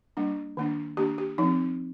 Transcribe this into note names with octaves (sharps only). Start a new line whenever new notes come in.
G3 A#3 D4
D#3 A#3 D4
D#3 A#3 D4 G4
G4
F3 C4 D#4